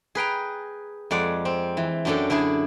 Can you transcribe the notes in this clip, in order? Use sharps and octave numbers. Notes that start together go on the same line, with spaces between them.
G#4 B4 G5 A#5
F2 G#3 D5 F#5
C4
E3
F#2 F#3 C#4 D4 A4 G5
D3 D4 E4 G#4